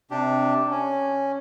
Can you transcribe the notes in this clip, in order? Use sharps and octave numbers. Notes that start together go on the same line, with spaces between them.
C3 D4 G4
C#4